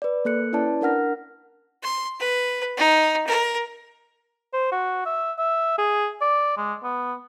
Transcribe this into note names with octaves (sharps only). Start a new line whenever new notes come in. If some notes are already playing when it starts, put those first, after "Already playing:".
B4 D5
A#3 A4 F#6 C#7
C#4 E4 B4 D5 A5
D4 A#4 F#5 F6 A#6
C6
B4
D#4
A#4
C5
F#4
E5
E5
G#4
D5
G#3
B3